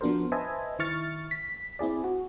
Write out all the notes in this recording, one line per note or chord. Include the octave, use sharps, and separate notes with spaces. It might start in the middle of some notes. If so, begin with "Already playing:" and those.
F3 B3 D4 F#4 A#4 C5
B4 C5 D#5 E5 G#5 A5
D#3 E4 C#6 F6 A6
B6
C4 E4 G#4 D5
F#4